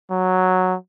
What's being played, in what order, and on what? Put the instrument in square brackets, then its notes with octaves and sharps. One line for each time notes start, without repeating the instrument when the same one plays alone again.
[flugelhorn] F#3